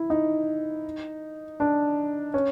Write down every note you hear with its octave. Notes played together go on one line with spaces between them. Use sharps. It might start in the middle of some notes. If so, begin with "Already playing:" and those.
Already playing: E4
D#4
D4
C#4